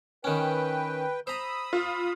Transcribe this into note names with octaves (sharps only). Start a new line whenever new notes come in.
D#3 C#4 B4 G5
C5 A#5 B5 D#6 E6
F4